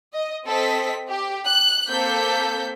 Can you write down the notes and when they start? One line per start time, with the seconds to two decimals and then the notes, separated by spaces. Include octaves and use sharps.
0.13 D#5
0.45 C4 A4 D#5 B6
1.09 G4
1.46 F#6
1.89 A#3 C4 A4 G6 B6